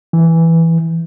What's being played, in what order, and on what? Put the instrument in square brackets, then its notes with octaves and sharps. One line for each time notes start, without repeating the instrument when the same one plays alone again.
[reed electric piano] E3